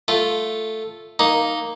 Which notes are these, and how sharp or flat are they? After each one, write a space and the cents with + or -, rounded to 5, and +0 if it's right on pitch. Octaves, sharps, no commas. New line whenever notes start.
A3 +0 F4 +0
A#3 +0 D#4 +0